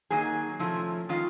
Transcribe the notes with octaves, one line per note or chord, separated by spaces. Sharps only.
D#3 F#3 A#3 D#4 G#4
C3 F3 A3 C#4 E4
D#3 G#3 C#4 F4